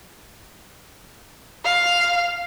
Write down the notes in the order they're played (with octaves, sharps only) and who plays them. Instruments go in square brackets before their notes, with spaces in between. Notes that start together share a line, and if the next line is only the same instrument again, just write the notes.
[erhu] F5